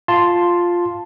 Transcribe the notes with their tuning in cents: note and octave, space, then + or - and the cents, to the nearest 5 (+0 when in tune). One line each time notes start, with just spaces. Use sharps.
F4 +0 A5 +0 C6 +0